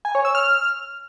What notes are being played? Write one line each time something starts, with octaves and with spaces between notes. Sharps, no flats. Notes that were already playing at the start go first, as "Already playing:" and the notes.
G#5
C#5
E6
F6